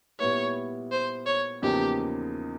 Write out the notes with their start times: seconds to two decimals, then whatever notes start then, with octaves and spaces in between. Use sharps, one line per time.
0.20 A#2 G3 B3 E4 C#5
0.92 C5
1.26 C#5
1.62 E2 C#3 F3 A#3 D#4 G4